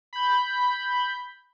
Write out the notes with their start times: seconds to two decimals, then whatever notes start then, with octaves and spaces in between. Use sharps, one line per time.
0.13 B5 G6